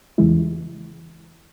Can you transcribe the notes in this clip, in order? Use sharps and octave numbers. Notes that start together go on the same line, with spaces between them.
E2 C#3 E3 G#3 E4